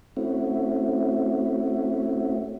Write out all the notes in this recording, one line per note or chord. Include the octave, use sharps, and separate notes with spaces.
A3 C4 C#4 E4 F#4